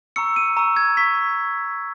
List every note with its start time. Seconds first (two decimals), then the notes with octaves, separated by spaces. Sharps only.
0.16 A#5 C#6 E6 C#7
0.36 D#7
0.57 A#5 C#6 E6
0.77 G#6
0.96 A#5 C#6 E6 B6